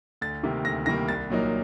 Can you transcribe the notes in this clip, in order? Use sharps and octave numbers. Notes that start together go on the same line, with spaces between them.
D2 A6
C3 D#3 G3 A#3
D2 A#6
C3 D#3 G3 A#3 A#6
C2 A6
A#2 F#3 A#3 D#4